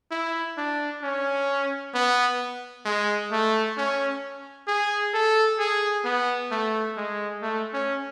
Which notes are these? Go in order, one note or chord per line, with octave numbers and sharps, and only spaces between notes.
E4
D4
C#4
B3
G#3
A3
C#4
G#4
A4
G#4
B3
A3
G#3
A3
C#4